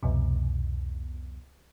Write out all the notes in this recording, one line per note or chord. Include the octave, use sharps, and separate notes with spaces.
C2 F2 B2